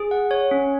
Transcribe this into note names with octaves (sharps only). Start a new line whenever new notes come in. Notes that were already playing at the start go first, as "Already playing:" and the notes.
Already playing: G#4
F#5
C#5
C#4